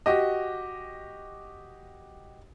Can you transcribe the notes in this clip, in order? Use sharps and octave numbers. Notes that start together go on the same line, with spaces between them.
F#4 G4 D#5